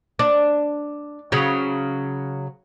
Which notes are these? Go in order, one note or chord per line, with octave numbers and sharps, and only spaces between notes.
D4
C#3 F#3